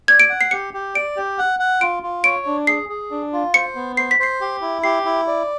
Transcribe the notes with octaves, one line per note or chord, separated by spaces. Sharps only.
D5 G#6
D7
F#5
C7
G4 C#7
G4
D5 D7
G4
F#5
F#5
F4 D7
F4
C#5 D7
D4
G#4 C7
G#4
D4
F4
C5 C#7
B3
C5 C7
B6
C5 C7
G4
E4
G4 C7
E4
D5